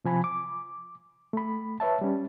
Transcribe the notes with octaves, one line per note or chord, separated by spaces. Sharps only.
C3 F3 G#5 B5
D6
A3 B5
B4 C#5 E5 A5
G3 C#4